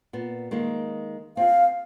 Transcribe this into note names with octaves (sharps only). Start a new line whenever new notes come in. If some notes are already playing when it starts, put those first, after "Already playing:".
A#2 B3
D#3 G#3 A#3
C4 F4 G#4 F5